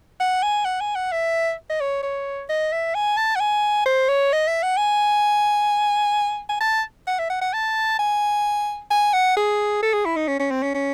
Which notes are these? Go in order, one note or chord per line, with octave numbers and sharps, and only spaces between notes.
F#5
G#5
F#5
G#5
F#5
E5
D#5
C#5
C#5
D#5
E5
G#5
A5
F#5
G#5
C5
C#5
D#5
E5
F#5
G#5
G#5
A5
F#5
E5
F#5
F#5
A5
G#5
G#5
F#5
G#4
A4
G#4
E4
D#4
C#4
C#4
C4
C#4
C#4